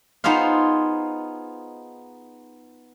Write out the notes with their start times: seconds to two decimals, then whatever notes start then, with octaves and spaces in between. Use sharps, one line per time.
0.24 B3 D#4 F4 G#4 C5 F5